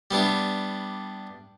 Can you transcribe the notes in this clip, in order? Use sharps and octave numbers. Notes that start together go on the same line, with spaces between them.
G3 B3 D4 E4